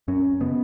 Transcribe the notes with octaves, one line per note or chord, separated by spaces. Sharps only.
F#2 C#4
C#3 B3